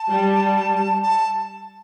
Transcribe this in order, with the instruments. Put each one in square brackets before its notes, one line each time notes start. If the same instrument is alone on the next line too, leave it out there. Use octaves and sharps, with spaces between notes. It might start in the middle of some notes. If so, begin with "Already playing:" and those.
Already playing: [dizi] A5
[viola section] G3
[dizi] A5